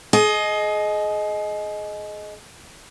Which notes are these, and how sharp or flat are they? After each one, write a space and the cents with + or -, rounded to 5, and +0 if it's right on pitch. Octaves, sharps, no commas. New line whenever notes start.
G#4 +35 D#5 +0